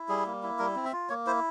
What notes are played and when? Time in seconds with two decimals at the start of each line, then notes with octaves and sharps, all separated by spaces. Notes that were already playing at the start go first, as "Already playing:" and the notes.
Already playing: E4
0.09 G3 G#4
0.26 A#3
0.43 E4
0.59 G3 A#4
0.76 C4
0.85 E5
0.93 F4
1.09 A#3 C#5
1.27 E4 C5